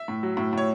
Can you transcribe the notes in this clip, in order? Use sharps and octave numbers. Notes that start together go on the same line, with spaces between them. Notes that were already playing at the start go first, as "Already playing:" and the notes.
Already playing: E5
A2
F#3
A2
A2 C#5